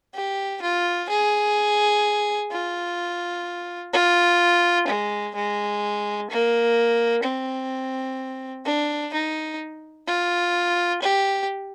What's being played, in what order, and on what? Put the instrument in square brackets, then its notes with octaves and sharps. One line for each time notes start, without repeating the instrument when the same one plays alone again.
[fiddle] G4
F4
G#4
F4
F4
G#3
G#3
A#3
C4
D4
D#4
F4
G4